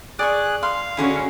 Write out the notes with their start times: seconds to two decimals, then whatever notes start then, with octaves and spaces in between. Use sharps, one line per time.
0.19 G#4 D5 C#6 F#6
0.63 F5 C6
0.97 D3 C#4 E4 F#4 G#4 C#6